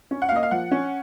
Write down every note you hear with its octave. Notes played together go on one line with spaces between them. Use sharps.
C#4
F#5
F5
A#3 D#5
F5
F3 F#5
C#4